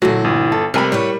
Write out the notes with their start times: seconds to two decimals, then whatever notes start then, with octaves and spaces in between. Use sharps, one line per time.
0.02 A#2 D3 E3 F#3 A3 F#4
0.24 G1
0.52 A4
0.74 C3 G3 A3 A#4 G#5 B5
0.92 A2 G3 B4 C#5